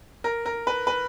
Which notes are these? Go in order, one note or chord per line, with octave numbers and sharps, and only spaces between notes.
A#4
A#4
B4
B4